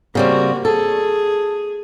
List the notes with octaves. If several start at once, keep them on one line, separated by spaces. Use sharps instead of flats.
C#3 G3 A#3 C4 F#4
G#4 A4